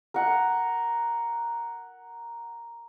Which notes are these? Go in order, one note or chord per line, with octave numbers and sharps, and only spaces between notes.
A#4 F#5